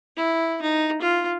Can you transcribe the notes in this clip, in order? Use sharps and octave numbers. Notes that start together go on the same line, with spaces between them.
E4
D#4
F4